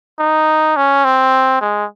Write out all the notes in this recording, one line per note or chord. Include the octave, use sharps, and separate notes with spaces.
D#4
C#4
C4
G#3